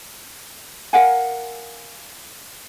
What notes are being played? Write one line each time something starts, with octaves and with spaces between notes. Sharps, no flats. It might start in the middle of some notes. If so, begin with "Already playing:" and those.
A#4 F5 F#5 G#5